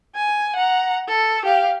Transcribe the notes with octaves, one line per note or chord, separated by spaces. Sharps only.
G#5
F#5 A#5
A4
G4 F5